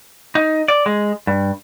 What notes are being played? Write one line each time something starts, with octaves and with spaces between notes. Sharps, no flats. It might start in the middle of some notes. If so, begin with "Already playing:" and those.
D#4
D5
G#3
G2